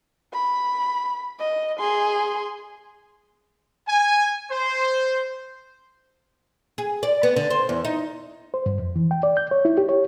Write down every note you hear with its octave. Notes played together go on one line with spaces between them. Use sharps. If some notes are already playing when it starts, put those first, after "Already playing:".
B5
D#5
G#4 C6
G#5
C5
G#4
D5
B3
D3
C5
E2
D#4
C5
G2
F2
E3
G5
D5
G6
C#5
E4
G4
C#5